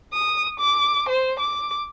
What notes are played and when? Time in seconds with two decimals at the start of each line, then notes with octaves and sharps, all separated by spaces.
0.12 D#6
0.59 D6
1.08 C5
1.39 D6